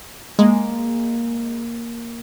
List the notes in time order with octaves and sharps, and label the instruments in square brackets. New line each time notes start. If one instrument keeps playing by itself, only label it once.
[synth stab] G#3 [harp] A#3